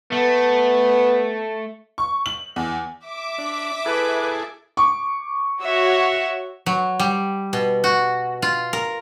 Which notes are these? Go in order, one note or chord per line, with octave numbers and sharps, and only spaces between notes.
A3 B3
C#6
F#7
E2
E5 D6
D4
E4 G#4 A4 B4
C#6 D6
F#4 C#5 E5
F#3
G3
B2
F#4
F4
A#4